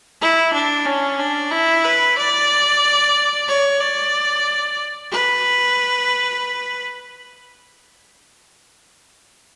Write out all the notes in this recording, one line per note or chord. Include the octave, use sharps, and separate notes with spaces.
E4
D4
C#4
D4
E4
B4
D5
C#5
D5
B4